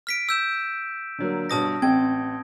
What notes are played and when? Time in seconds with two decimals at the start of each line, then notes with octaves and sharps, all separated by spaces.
0.07 F6 B6 D7
0.29 E6 G6 E7
1.18 D3 F#3 A#3
1.50 G2 B2 C#5 A5 D#6 A#6
1.82 A1 C4 G5 G#6